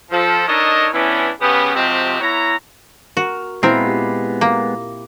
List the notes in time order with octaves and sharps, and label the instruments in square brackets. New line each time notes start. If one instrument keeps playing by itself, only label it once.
[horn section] F3 A4
D4 D#4 A4 A#4 C#5 D#5
E3 B3 C#4 D4 E4
C#3 B3 G4
C3 F3 G#3 C4 F#4 G4
B3 E4 C#5 A#5
[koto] F#4 [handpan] A#4
[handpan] A#2 E4 [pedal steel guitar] G#3 B3 F5 [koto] C4 A#4
[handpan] G4
[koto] A#3